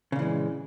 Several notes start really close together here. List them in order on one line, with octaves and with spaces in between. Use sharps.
C#3 A#2 E3 G#3